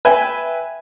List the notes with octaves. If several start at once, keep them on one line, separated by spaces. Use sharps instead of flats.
B4 E5 G5 G#5